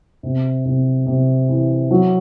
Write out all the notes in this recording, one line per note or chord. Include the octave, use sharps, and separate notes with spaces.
C3
C3
C3
E3
F#3